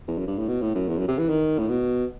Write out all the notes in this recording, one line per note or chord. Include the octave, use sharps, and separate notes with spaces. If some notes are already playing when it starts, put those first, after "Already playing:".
E2
F#2
G2
A2
B2
A2
F#2
E2
F#2
C3
E3
D#3
A2
B2